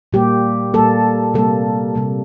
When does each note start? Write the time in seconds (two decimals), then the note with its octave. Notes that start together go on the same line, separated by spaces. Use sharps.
0.13 A#2 G3 A#3 G4
0.74 A#2 G3 A#3 A4
1.34 C3 G3 A#3 A4
1.95 C3 G3 A#3